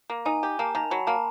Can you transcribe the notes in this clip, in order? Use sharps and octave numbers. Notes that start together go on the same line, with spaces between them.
A#3
D#4 G#5
G4
A#3 A5
D#3 A#5
F#3 B5
A#3 A5